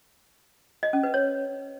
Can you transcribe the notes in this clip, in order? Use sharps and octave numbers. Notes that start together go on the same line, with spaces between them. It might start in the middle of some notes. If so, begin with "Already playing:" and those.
D#5
C#4
B4
C#5